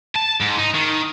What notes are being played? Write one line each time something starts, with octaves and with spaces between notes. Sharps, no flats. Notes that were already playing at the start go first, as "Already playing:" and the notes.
A5
G#2
D#4
D#3